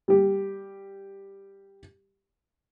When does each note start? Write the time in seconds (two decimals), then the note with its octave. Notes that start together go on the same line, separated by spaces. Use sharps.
0.08 G3 G4